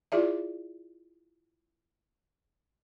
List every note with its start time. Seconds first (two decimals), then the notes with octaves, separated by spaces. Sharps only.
0.12 E4 F4 G#4 D5 E5